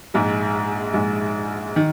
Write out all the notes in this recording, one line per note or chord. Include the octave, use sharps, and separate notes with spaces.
A#1 G#2 G#3
A#1 G#2 G#3
D#3